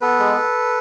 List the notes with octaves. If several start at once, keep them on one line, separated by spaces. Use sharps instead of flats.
B3 A4 B4
G#3